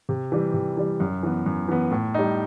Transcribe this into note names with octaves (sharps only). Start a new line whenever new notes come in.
C3
E3 G3
C3
E3 G3
F#2
E3 B3
F#2
E3 B3
A2
G3 D#4